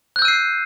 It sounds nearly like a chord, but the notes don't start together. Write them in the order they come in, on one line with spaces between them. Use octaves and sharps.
F#6 G6 E6 D#7 C7